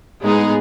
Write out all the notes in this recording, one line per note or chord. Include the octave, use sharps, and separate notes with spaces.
A2 G#3 B3 D#4 G#4